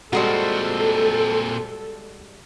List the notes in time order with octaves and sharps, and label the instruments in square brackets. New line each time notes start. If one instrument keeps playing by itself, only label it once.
[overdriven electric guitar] A#2 C4 [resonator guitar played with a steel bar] G3 G#3 F#4 [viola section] A4